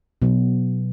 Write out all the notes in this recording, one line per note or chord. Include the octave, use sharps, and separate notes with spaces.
B2 F#3 B3